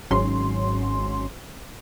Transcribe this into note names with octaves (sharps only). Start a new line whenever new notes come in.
G#1 G#2 F#3 C#4 C6